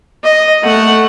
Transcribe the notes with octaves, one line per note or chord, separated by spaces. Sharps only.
D#5
A3 F#5